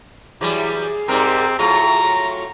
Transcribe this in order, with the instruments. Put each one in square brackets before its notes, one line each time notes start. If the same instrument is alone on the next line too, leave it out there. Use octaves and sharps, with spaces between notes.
[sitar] E3 F#3 G3 [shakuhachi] G#4
[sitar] G#2 G3 A#4 [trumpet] C4
[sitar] A2 F#3 F4 [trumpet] A#5